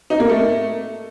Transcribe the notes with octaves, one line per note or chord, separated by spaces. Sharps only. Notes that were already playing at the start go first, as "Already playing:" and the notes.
D#4
A#3
A3